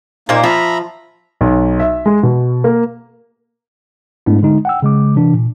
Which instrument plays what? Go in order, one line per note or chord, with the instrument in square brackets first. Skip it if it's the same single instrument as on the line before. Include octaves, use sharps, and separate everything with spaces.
[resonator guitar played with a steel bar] A#2 C5 [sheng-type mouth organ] A#3 D#4
[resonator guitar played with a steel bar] F3 [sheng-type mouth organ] E5 A#5 B5
[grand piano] B1
E5
G#3
B2
A#3
[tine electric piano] G#2 G#3 A3 B3 D4 E4
D3 G#3 D#4
F#5 G5 E6
C#3 G#3 D6
C3 E3 D4
A#2